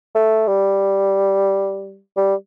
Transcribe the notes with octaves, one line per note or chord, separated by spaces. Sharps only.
A3
G3
G3